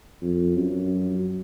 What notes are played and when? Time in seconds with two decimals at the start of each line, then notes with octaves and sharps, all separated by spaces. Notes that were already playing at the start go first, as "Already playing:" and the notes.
0.22 F2
0.56 F#2